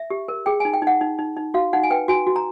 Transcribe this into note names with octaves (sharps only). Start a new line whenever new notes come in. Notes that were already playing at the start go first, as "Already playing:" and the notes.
Already playing: E5
G4
A#4
G#4 G5
D#4 G#5
G5
D#4 F#5
D#4
D#4
D#4
F#4 F5
D#4 F#5
G#5
B4 G5
F#4 G#5
F#4
A#5